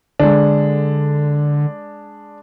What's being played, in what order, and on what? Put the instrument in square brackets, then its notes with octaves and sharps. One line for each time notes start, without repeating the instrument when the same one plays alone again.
[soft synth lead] D3 [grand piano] G#3 D4